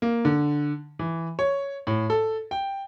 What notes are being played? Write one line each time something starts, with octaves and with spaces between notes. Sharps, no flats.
A#3
D3
E3
C#5
A2
A4
G5